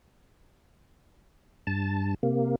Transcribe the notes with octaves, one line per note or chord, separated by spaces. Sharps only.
G2 A5
C3 A#3